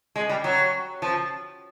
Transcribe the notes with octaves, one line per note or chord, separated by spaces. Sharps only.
G#3
G3
F#3
F3